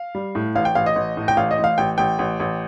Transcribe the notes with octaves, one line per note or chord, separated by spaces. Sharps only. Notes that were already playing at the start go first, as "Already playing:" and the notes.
Already playing: F5
G3
A2
A1 F5
G5
A1 F5
D#5
A1
A2
G5
A1 F5
D#5
A1
F5
A1 G5
A1 G5
A1
A1